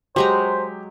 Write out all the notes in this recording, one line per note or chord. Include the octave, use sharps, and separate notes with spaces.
F#3 G#3 G4 C5 A#5